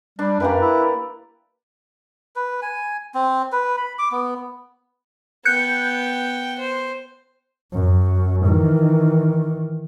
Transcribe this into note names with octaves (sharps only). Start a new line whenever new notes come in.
G3 D4
F#2 A#3 G4 B4
E4
B4
G#5
C4
B4
B5
D6
B3
B3 G5 F#6 G6 C#7
C5
F#2
D#3 E3